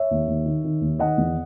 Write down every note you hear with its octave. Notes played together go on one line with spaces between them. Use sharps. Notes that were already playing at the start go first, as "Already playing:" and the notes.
Already playing: C#5 E5
D#2
D#2
D#3
D#3
D#2
D#3 D#5 F#5
E2